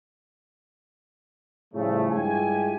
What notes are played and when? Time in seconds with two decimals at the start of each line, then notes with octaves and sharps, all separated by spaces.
1.74 A2 C#3 F3 G3 A3
2.10 G2 G#3 E4 F4 G4 G#5